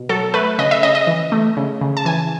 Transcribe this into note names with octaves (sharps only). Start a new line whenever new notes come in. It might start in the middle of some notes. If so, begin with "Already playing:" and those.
Already playing: B2
F#3 A4
A3 B4
C#3 D#5
E5
C#3 D#5
D#5
E3
A3
C#3
C#3
A5
E3 G#5